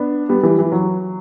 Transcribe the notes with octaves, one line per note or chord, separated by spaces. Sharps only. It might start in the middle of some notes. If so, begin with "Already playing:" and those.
Already playing: B3 D4
G3 B3
E3 G3
E3
F#3